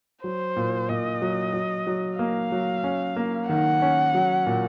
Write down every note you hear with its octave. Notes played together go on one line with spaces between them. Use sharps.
F#3 C5
A#2
A#2 D#5
F#3
F#3
F#3
A#3 F5
F#3
C#4
A#3
D#3 F#5
C#4
F#3
A#2